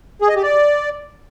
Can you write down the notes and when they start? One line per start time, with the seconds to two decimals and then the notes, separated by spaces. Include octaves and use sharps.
0.22 G#4
0.29 D#5
0.36 G4
0.43 D5